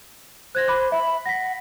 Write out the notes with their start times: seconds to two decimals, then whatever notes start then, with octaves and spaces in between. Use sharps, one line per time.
0.55 C5 F#6 G#6 A#6
0.68 B5 D6 F#6
0.92 E5 B5
1.26 F#5 A#6 B6